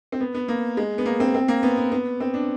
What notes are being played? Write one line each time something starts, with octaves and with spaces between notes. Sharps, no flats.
C4
B3
B3
A#3
G#3
B3
A#3
C4
C4
A#3
B3
B3
B3
C4
D4